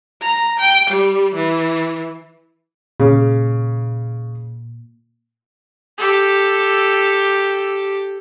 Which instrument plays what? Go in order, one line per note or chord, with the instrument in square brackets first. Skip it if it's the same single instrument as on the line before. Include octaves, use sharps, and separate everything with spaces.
[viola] A#5
G5
G3
E3
[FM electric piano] A#2 [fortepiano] C#3
[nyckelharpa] G4 A4